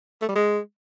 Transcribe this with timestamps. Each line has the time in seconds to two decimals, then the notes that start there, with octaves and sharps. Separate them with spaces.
0.22 A3
0.28 G3
0.35 G#3